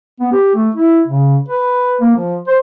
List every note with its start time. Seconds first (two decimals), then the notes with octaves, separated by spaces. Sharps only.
0.20 B3
0.32 G4
0.55 A3
0.75 E4
1.07 C#3
1.49 B4
2.01 A#3
2.16 F3
2.47 C5